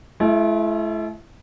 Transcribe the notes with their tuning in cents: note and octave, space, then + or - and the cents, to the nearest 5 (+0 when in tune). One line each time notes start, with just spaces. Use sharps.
A3 -40 E4 +30